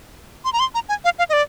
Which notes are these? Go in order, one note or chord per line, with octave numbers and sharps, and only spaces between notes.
C6
A#5
C6
A#5
G#5
F5
F5
D#5
D5